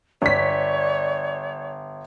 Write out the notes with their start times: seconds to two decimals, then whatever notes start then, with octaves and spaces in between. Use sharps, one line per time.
0.22 G1 C#5 D5 B6